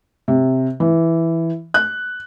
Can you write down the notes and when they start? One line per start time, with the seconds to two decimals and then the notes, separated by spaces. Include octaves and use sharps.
0.28 C3
0.80 E3
1.74 F#6